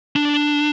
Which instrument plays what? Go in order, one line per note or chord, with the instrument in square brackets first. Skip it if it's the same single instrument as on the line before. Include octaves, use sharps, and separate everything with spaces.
[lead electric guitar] D4